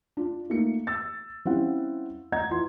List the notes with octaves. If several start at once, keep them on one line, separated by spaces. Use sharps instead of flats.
D4 F4
A3 A#3 D#4 A#4 C#7
E6 A6
G3 C4 C#4 E4 F5 F#5
D#5 F#5 A#5 G#6
E3 F4 C6